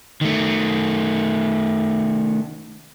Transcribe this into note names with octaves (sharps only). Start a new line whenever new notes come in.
D#3 A3